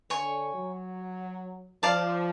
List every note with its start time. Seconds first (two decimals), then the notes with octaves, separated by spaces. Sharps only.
0.10 D3 C#5 G#5 C#6
0.54 F#3
1.83 F3 D5 F5 A5 D6